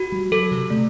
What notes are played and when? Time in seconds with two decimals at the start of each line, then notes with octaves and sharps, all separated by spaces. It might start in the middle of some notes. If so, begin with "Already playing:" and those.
Already playing: F#4
0.12 G3
0.32 F#3 A4
0.51 C3
0.70 C3 A3